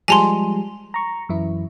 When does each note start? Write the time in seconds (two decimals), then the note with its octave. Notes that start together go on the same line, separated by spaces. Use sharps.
0.08 F3 G3 G#3 G#5 A5 C6
0.94 A#5 C#6
1.29 F#2 E3 E4